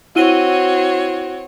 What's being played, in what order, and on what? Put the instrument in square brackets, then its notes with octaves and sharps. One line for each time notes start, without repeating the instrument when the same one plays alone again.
[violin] C4 C#5 [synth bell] E4 D#7 G7 [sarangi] F#4